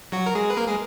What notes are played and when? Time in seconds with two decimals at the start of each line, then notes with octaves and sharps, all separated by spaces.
0.12 F#3 F#4
0.26 A#4
0.35 G#3 G#4
0.50 B4
0.57 A#3 A#4
0.67 G#3 G#4